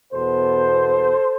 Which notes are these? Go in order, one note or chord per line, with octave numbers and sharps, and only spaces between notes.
E2 B2 B3 A4 C5